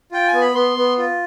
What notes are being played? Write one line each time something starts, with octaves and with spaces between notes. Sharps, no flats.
F4 G5
G#5
B3
B5
B3 C6
B3
F4